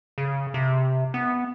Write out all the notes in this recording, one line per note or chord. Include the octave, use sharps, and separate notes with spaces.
C#3
C3
B3